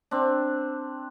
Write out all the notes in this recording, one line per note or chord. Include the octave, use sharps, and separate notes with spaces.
C4 D4